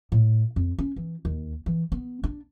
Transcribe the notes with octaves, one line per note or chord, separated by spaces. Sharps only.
A2
F2
C#4
E3
D#2
E3
B3
D4